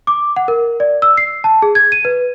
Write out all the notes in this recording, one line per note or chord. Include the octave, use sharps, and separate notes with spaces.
D6
F#5
A#4
D5
E6
C7
A5
G#4
G#6
D#7
B4